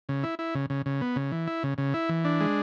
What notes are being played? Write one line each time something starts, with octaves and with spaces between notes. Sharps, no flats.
C#3
E4
E4
C#3
C#3
C#3
B3
C#3
E3
E4
C#3
C#3
E4
E3
D4
G#3